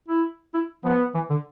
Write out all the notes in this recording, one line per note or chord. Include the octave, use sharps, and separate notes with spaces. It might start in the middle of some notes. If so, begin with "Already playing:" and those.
E4
E4
F3 B3
E3
D3